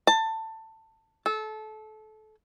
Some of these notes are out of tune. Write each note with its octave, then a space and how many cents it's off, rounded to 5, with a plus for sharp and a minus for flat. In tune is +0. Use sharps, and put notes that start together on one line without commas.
A5 +20
A4 -25